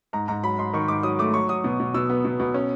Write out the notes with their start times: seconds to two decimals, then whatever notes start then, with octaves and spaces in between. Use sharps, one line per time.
0.13 G#2 A#5
0.28 G#2 A#5
0.44 F#3 B5
0.58 G#2 C6
0.73 D#3 C#6
0.88 G#2 D6
1.03 F#3 D#6
1.19 A3 D6
1.34 F#3 C#6
1.49 F#3 D#6
1.64 B2
1.80 B2
1.94 B2 E6
2.09 B3
2.25 B2
2.40 B2
2.54 C#4